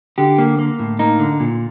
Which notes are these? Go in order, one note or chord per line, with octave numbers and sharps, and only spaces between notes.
D3 G4
A#3
A#3
A2
A#3 D#4
D3
A#2